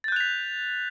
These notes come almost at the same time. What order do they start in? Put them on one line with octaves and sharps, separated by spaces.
A6 G6 F#6 F7 B6